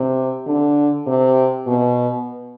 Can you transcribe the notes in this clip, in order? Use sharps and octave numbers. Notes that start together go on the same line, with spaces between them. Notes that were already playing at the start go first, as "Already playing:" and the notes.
Already playing: C3
D3
C3
B2